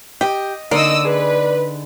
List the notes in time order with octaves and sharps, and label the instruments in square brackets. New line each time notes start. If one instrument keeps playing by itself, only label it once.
[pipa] G4 [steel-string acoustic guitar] D#5
[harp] D3 D#4 [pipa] A#3 [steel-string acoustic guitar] D5 [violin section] D#5 D#6 E6
[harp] G#4 [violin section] B4